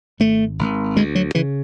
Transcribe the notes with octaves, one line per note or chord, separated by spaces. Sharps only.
G#1 A3
G#1
D2 G#3
F#3
C#3 E3